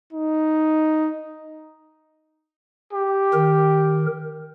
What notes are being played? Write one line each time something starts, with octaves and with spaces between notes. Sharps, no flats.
D#4
G4
D#3 A#4